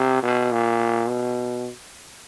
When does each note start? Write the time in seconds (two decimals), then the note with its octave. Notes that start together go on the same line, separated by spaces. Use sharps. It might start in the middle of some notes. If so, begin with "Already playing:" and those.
Already playing: C3
0.23 B2
0.52 A#2
1.09 B2